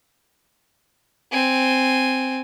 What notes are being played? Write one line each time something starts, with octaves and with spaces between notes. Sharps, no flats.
C4 G#5